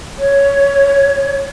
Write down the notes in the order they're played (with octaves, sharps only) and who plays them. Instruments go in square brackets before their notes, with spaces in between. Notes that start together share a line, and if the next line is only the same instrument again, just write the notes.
[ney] C#5